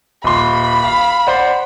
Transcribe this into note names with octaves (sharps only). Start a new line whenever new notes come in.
D#1 B5 C6
F5
C5 D5 F#5